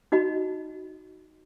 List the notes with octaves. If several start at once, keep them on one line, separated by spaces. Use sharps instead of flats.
D#4 F#4 D#5 B5